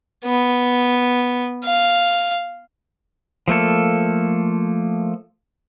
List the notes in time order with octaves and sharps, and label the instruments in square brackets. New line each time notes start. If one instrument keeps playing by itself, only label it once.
[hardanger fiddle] B3
F5
[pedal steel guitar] F3 A3 A#3 A4